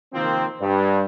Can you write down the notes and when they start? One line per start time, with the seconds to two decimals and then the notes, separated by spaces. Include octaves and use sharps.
0.13 C3 D#3 F3 A#3 C4
0.61 G2